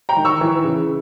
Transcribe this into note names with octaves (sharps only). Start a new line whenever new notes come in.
G5 A#5
D#3
C#6 E6
E3
C#3